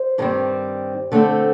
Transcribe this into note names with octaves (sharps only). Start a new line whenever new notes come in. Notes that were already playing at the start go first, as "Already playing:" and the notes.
Already playing: C5
G2 D#3 G3 C4
D3 A3 C4